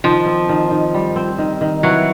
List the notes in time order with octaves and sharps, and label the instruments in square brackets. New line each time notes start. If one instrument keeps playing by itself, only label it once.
[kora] D#3 [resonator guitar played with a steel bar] F3
[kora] C4
D#3
D#3
G3
C4
D#3
D#3
[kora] E3 [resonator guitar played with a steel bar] F#3